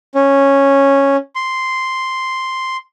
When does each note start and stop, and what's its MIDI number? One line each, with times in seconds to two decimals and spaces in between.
0.15 1.16 61
1.36 2.77 84